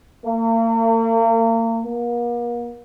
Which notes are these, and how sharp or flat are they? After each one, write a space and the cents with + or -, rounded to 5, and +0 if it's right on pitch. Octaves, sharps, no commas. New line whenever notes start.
A#3 -40
A#3 +40